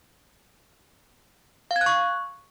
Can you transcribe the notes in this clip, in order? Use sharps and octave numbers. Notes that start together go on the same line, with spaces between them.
F5
G#6
F#6
C#6